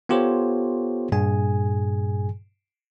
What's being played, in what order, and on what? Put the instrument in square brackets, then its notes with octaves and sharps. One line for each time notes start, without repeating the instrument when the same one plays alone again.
[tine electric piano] B3 F4 G4 A4 C5 C#5
G2 A#2 G#4 G#5